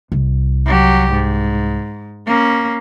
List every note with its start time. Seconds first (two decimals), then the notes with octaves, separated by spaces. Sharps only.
0.12 C2
0.66 F#3 G4
1.12 G#2
2.27 A#3 C#4